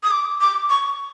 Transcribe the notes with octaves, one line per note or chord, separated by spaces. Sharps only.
D#6
D6
D6
C#6